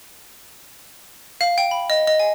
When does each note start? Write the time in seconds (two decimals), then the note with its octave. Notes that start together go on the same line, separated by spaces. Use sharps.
1.41 F5
1.58 G5
1.71 B5
1.90 D#5
2.07 D#5
2.20 G#5